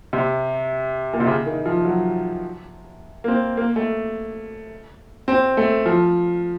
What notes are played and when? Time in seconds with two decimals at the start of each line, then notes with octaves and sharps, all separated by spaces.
0.13 C3
1.13 A#2
1.20 C3
1.27 C#3
1.46 D#3
1.65 F3
1.85 F#3
3.24 A#3
3.28 C4
3.57 A#3
3.76 A3
5.28 C4
5.57 A3
5.86 F3